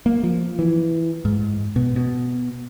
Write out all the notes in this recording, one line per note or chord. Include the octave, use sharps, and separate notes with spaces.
A#3
F3
E3
G#2
B2
B2